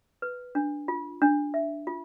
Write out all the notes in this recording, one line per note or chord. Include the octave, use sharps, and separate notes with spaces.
B4
D4
F4
D4
E5
F4